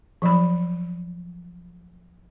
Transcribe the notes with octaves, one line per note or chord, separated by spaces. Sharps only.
F3 F#3 B5